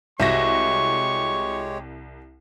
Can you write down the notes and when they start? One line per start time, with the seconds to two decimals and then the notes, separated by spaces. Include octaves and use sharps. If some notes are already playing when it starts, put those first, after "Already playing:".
0.20 C2 G#3 F#4 G4 C#5 E5 C#6 A#6